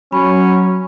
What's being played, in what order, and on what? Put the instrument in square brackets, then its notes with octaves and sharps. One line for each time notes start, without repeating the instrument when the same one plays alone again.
[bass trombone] F#3 [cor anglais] C#4 [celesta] B5